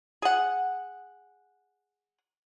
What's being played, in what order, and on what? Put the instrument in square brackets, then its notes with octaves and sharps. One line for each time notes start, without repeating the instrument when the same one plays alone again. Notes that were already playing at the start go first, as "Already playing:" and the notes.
[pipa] G#4 F#5